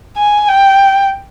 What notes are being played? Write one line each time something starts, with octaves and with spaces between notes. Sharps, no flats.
G#5
G5